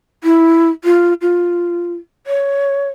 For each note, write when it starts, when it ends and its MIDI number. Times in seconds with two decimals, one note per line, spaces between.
0.24 0.69 64
0.84 1.13 65
1.21 1.94 65
2.27 2.88 73